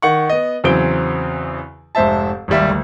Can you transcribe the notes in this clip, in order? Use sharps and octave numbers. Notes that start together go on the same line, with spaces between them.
D#3 F#5 C#6
B3 D#5
E2 C#3 F#3 C4 D7 G7
F1 G#2 C5 E5 A5
G#1 D#2 G3 E5
D2